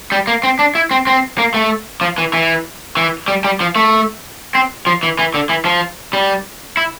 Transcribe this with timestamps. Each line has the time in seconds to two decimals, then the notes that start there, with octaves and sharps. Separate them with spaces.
0.12 G3
0.27 A#3
0.43 C4
0.59 D4
0.75 E4
0.91 C4
1.07 C4
1.38 A#3
1.54 A3
2.01 F3
2.18 E3
2.33 E3
2.97 E3
3.28 G3
3.45 G3
3.61 F3
3.76 A3
4.55 C4
4.87 F3
5.03 E3
5.19 E3
5.34 D3
5.49 E3
5.65 F3
6.13 G3
6.77 E4